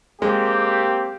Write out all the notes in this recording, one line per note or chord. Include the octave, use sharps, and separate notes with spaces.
G#3 A#3 C4 G4